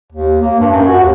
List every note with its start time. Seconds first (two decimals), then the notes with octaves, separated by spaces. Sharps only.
0.12 D#2
0.42 A#3
0.60 G2
0.73 F#2
0.88 F#4
1.01 D#2